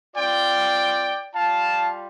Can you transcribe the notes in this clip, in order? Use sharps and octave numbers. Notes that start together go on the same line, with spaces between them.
C4 F4 D5 G5
G3 F4 F5 A5